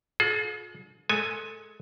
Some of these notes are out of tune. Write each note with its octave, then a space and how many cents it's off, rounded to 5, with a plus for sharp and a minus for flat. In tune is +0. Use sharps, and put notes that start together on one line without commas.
F4 +40 G#4 +45
G#3 +30 A4 +15 G#5 +0